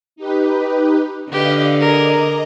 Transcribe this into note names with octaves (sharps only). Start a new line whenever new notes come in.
D#4 G4 B4
D3 G4 B4 D5 D#5 F5
G#4 A#4 D#5 A#5 D6